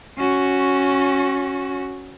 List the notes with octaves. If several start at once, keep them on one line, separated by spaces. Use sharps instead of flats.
C#4 F#4